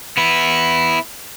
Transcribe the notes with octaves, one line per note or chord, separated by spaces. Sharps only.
B3 E4